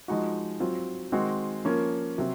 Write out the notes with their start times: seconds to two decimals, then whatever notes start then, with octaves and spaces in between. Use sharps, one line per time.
0.08 F3 G#3 D#4 F#4
0.60 F#3 C4 F4
1.12 D#3 G#3 C4 F#4
1.65 F3 A#3 C#4
2.18 C3 F#3 C4